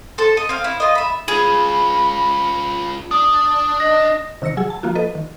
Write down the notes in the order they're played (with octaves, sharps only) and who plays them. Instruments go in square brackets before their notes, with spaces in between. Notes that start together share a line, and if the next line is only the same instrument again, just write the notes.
[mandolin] A4 C5
D#5
C4 F5
E4
F4 D#5
E5 B5
[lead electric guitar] C#4 F4 [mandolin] G#4 [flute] B5
[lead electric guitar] D4 [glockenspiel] D#6
[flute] D#5 [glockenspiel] A#6
[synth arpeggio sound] C3 D#3 E6 A#6 C#7
F#3 G#4 G#5 E6
A5
F3 A#3 F4 F#4
A4 B4 D#5
D#3